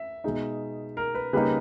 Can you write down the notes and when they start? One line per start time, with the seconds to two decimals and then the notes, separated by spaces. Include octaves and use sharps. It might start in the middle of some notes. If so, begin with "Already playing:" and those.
Already playing: E5
0.24 B2 G#3 D#4
0.97 A#4
1.15 B4
1.33 C#3 G3 A#3 D#4 B4